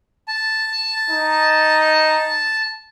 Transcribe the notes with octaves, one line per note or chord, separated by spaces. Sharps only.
A5
D#4